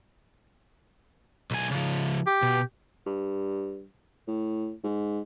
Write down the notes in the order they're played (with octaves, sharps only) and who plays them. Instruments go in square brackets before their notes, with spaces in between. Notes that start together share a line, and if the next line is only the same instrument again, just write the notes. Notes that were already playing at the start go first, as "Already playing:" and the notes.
[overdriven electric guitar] B1 G#5
C#3 F3
[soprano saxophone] G4
[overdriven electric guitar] B2
[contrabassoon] G2
A2
G#2